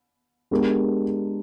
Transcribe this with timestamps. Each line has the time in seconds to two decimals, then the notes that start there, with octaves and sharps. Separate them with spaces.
0.51 G#3 B3 D4 G4 A#4